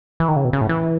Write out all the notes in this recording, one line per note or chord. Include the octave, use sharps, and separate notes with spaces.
E3
D#3
C#3
B2
C#3
A2
E3